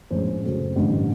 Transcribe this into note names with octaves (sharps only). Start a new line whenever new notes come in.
A#1 A2 F3 G#3 C#4 C5
F#2 C#3 F#3 A3 C4
A1 G2 D3 G3 C4